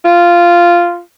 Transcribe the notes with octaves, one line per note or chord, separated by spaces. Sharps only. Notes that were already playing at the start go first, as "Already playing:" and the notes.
F4